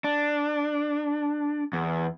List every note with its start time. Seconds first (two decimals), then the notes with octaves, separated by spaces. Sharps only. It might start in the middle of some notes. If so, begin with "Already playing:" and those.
0.04 D4
1.73 E2